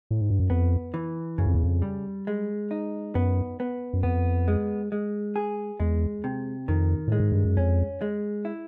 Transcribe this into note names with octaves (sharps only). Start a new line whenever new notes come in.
A2
G#2
G2
F#2
F2 B3
E3
F#2 C#3
F2
E2
F2
G3
G#3
D#4
F#2 B3
B3
F#2
F2 B3
G#3
G#3
G#4
E2 G#3
C3
F2 D#3
A2 G#3
G#2
G2
F#2
F2 C#4
G#3
E4